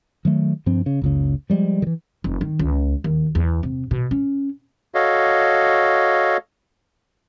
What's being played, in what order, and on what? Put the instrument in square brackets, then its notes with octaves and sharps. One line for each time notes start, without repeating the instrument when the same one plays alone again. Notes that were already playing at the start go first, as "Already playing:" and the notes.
[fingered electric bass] D#3 F#3 A3
G2 F3 C4
C#3
F#1 C#2 C#3
F3 G3 G#3
D#3 E3
[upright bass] F1
D#3
C#2
D#2
E2
C3
B2
C#4
[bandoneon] F#4 A4 C#5 D#5 F5